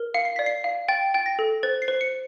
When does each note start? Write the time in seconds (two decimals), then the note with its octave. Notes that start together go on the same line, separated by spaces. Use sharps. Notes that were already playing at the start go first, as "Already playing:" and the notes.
Already playing: A#4
0.14 F5 C#7
0.25 C7
0.36 D5 B6
0.46 C7
0.64 F5
0.88 G5 A6
1.14 G5 A6
1.26 A#6
1.39 A4
1.63 C5 A6
1.82 C7
1.88 C5
2.01 C#7